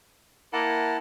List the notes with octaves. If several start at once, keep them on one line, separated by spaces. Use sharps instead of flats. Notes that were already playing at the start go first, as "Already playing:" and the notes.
A#3 E4 F#5 A5